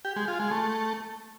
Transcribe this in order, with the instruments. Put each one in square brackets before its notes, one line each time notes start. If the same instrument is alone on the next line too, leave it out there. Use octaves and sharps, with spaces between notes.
[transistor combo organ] G4
G#3
F4
G#3
A3